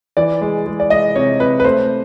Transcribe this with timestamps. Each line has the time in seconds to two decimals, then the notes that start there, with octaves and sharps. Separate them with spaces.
0.17 E3 D5
0.41 G#3
0.66 G#3
0.80 D5
0.90 G#3 D#5
1.16 C3 C#5
1.40 C3 B4
1.60 B4
1.64 A3 C5